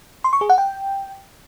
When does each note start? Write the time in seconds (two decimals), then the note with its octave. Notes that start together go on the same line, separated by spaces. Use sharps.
0.24 C6
0.33 C#6
0.41 G#4
0.50 F#5
0.58 G5